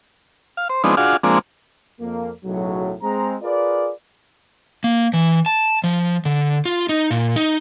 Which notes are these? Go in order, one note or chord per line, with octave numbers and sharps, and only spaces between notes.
F5
C5
F3 G#3 B3 C4 D4 D#4
D4 F4 F#4 G#4 F5
F3 G#3 A#3 C4 D4
F2 A#3
B1 A2 C#3 F#3
G#3 C4 A#5
F4 G#4 A#4 B4 D5
A#3
E3
A5
F3
D3
F4
D#4
A#2
D#4